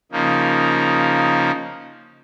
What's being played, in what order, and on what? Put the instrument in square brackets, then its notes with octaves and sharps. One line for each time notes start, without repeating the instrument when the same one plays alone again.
[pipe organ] C#3 F3 A#3 D#4